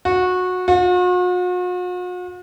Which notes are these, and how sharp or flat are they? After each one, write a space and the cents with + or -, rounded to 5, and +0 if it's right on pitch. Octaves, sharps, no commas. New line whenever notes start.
F#4 -20
F#4 -45